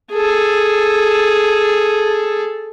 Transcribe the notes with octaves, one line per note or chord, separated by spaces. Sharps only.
G#4 A4